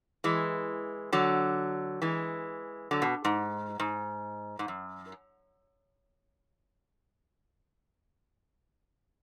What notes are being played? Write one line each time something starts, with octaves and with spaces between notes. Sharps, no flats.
E3 G#3
D3 F#3
E3 G#3
D3 F#3
B2
G#2
G#2
G#2
F#2